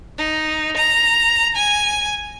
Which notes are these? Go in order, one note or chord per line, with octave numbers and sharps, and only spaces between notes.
D#4
A#5
G#5